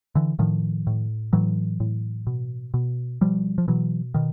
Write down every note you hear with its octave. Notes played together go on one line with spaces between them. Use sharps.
D3 E3
A2 D#3 F3
A2
A2 E3 F#3
A2
B2
B2
B2 F3 G3
F3
B2 E3 F#3
B2 D#3